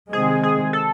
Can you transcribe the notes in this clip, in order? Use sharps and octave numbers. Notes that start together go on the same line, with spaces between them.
C3 D#3 G#3 C4 G#4
G#4
A4